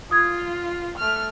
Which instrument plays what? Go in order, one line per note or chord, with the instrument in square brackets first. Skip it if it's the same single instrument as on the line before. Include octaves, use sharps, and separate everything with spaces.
[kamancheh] F4 [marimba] D#6 G#6
[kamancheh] A3 F6